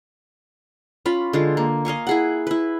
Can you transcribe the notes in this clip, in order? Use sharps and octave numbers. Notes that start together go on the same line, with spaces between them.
C#4 F4 B5
D3 G#3 F4
A#3
D#5 F5 G#5 C#6
E4 G#4 F#5
E4 B4